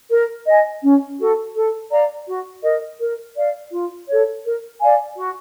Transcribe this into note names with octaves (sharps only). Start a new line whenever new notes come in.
A#4
D#5 G#5
C#4
F#4 A4
A4
D5 F5 A#5
F#4
A#4 D#5
A#4
D5 F5
F4
A4 C#5
A#4
D5 F5 G#5
F#4